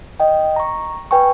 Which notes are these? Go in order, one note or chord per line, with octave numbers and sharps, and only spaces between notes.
D#5 G5
A#5 C#6
B4 G5 G#5 C#6